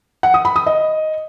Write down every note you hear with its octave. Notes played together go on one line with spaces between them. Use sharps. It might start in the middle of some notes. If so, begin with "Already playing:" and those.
F#5
D#6
B5
D#6
D#5